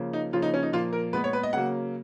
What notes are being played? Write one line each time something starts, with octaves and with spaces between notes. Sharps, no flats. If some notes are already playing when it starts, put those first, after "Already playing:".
Already playing: C#3 F3 A#3
D#4
C#3 F3 A#3 F4
D#4
C#4
D#4
A#2 F3 A#3 F4
A#4
A#2 G#3 B3 B4
C#5
B4
D#5
C#3 F#3 A#3 F#5